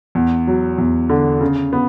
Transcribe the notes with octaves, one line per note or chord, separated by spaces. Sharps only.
E2
F#3
E2
D3
C#3
B3